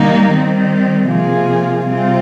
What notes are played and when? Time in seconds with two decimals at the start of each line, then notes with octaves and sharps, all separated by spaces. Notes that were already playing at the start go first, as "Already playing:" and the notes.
Already playing: D#3 G3 A#3 D#4
0.30 D#3 G3 C4
1.07 C3 F3 A#3 F4 G#4
1.86 C3 G3 C4 F4